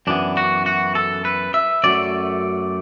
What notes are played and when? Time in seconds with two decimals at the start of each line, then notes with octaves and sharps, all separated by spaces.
0.07 F#2 E3 B3 D4
0.37 F#4
0.66 F#4
0.95 A4
1.25 B4
1.54 E5
1.84 F#2 F#3 A3 D5